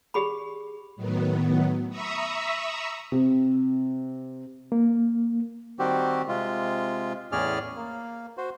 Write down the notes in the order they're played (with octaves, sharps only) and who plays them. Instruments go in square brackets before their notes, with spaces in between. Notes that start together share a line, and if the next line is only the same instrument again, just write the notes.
[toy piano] G4 G#4 B5
[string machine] A2 D#3 F#3 B3
E5 A#5 B5 C#6 D#6 E6
[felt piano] C3
[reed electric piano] A#3
[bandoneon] D#3 G3 C4 F#4 G4
C3 G#3 F4
E2 A2 C#4 G#4 D5 F6
A#3
F#4 C5